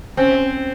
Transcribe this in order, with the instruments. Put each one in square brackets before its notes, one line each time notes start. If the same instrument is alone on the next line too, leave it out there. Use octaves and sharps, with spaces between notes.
[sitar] C4 [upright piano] C#4